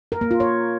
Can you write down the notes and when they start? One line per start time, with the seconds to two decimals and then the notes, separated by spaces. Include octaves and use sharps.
0.12 A#4
0.21 A#3
0.31 F4
0.40 C#5